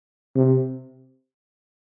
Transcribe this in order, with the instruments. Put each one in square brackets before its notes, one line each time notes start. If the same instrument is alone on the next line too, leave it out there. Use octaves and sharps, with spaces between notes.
[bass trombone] C3